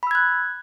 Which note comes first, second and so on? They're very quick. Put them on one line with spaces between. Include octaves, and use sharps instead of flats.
B5 E6 G#6 F#6